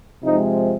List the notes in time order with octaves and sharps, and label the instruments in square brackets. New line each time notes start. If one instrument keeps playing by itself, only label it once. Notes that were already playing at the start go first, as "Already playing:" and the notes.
[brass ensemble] C3 F3 G#3 D#4